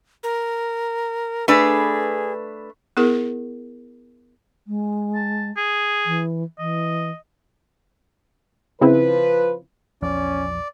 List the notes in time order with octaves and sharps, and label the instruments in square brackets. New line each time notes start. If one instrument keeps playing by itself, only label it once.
[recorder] A#4
[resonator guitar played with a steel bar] A3 D4 B4 [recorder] G#4
[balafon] B3 E4 G#4 A#4
[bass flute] G#3
[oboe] A5
G#4
[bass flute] E3
[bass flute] E3 [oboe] D#5
[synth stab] C#3 C4 E4 [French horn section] F3 B4
[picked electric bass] A#1 E2 F3 [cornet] C#4 [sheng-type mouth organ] D5